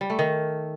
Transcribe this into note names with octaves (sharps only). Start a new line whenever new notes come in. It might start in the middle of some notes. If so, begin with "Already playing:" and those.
G3
A3
D#3